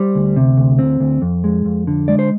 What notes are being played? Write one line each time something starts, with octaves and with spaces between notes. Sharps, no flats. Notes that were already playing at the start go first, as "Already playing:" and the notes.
Already playing: G3 C5
D2
C3
D2
C4
D2
F2
G#3
F2
D3
G#3 D5
C5